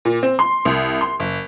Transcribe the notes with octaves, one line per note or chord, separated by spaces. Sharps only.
A#2
C4
C6
C2
C6
F#1